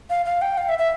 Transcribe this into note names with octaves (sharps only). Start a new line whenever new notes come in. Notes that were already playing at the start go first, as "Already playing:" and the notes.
F5
F5
G5
F5
E5
E5